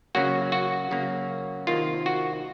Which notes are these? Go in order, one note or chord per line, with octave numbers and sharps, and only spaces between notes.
C#3 F#3 A#3 F#4
F#4
C#3 F#3 A#3
C3 D#3 A#3 F4
F#4